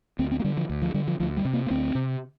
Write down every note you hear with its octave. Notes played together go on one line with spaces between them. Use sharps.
D2 C4
C4
A#3
D3 G3
F3
D2
F3
D3 G3
F3
D2 F3
G3
C3
A#3
A#3
D2 C4
C3